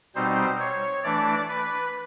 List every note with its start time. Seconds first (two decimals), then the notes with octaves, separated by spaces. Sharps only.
0.15 B2 G3 C4 D#4 C5
0.60 C#5
1.03 E3 A3 D4 D5
1.48 B4